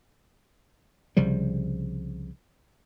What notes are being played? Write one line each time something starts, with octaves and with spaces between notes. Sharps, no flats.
C2 C#3 F3 G3